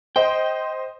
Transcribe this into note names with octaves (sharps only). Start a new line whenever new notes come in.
C5 D#5 G5